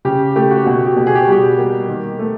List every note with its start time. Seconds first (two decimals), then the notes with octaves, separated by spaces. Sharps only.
0.05 C#3 G4
0.36 A3 G4
0.50 F#4
0.66 B2 F#4
0.86 G4
0.97 B2
1.07 G#4
1.15 G4
1.24 F#4
1.27 G3 G4
1.57 A#3
1.88 D#3
2.19 A3